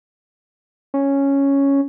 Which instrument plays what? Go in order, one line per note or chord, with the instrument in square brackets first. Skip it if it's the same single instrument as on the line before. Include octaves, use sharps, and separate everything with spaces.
[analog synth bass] C#4